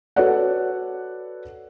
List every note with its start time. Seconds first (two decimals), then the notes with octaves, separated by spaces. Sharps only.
0.16 F#4 A4 B4 C#5 D5 F#5